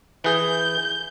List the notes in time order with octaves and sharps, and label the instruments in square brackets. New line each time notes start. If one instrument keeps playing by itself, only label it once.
[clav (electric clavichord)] E3 G#4 [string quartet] G6